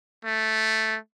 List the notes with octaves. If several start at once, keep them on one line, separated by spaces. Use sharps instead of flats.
A3